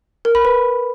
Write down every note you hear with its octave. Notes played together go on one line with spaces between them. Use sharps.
A#4
B5
B4